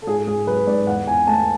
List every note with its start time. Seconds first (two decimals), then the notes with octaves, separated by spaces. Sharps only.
0.02 A4
0.07 G#2 G#4
0.27 G#2 G#4
0.47 F#3 B4
0.67 G#2 D5
0.87 E2 F#5
1.07 E2 G#5
1.27 A3 A5